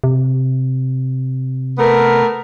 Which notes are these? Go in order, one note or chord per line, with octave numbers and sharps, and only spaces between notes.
C3
A3 B3 A#4